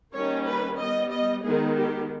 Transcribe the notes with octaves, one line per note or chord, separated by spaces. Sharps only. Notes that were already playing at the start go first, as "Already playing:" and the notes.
D#3 G3 A#3 C#4 C#5
B4
G3 B3 D#5
D#5
D#3 G#3 B3 G#4
G4